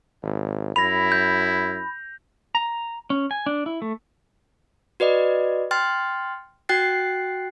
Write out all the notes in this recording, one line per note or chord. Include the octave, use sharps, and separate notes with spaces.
G#1
F#2 E4 B5 A#6 F7
G6
A#5
C#4
G#5
D4
E4
A3
F#4 B4 D5 D#5
G5 C6 F6 A6
F#4 G5 F#6 A6 C7